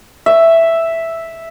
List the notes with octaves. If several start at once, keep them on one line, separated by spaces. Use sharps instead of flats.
E5